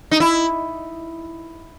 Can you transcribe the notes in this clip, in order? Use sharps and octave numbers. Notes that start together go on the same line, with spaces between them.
D#4
E4